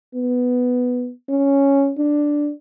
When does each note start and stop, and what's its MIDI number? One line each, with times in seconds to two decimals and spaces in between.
0.15 1.11 59
1.29 1.92 61
1.98 2.51 62